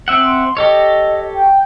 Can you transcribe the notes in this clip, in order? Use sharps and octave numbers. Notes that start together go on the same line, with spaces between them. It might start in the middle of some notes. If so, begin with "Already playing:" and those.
C4 E5 F#5
C6
G4 A4 C#5 D#5
G5